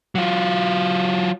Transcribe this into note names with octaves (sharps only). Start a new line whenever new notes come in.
F#3 F4